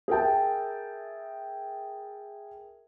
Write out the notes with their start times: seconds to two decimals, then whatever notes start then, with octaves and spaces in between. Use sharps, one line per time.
0.08 G#4 A#4 E5 G5 A5